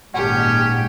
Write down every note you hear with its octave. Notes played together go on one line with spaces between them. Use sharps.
G#1 A#2 G#3 C#4 G4 F#5 A5